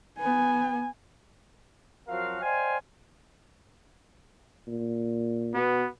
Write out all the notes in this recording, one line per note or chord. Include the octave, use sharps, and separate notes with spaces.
B3 G#5
F3 F#3 C4 F#4 A#4 F5
C5 D5 D#5 F5 G5 G#5
A#2
B2 B3